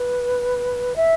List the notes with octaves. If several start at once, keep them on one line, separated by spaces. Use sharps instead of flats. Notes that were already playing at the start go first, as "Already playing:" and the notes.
Already playing: B4
E5